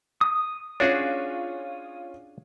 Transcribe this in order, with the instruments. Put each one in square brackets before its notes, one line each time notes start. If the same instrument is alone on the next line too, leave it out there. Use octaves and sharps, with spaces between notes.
[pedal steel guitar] D#6
[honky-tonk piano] C#4 F4 C#5 [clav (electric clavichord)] D4 F#4 G#4